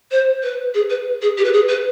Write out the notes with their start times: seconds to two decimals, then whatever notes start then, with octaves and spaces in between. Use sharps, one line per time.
0.11 C5
0.43 B4
0.74 G#4
0.90 B4
1.22 G#4
1.38 G4
1.45 B4
1.53 G#4
1.69 B4